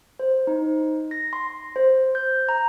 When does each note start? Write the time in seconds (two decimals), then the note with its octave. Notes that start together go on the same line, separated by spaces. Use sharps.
0.19 C5
0.47 D#4
1.11 A#6
1.33 C6
1.76 C5
2.15 G6
2.49 A#5